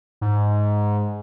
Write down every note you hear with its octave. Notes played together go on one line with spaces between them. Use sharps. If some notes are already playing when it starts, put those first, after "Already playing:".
G#2